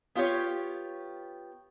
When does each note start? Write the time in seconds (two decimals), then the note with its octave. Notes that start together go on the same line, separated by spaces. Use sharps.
0.15 B3 F4 G4 C#5